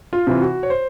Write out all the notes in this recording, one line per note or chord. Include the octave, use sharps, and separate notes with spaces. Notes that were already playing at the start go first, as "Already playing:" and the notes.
F4
C3 E3
F#4
C#5
C5